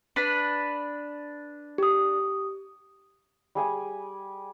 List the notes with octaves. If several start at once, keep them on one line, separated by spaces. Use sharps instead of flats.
D4 B4
G4 D#6
G3 G#4 G#5 D#6